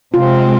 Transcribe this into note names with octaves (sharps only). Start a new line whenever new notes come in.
C3 G#3 C4 F4